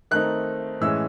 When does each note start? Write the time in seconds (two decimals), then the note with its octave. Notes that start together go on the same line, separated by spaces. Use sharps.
0.11 D#3 A3 C4 D#4 F#6
0.81 A2 E3 G#3 C#4 E6